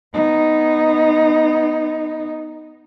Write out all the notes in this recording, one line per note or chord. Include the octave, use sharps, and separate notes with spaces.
B3 D#4